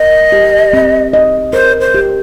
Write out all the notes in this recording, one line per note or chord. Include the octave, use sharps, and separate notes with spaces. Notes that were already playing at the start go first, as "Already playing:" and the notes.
Already playing: A#4 D#5
G4
C4
D#5
A#4 C5
C5
G4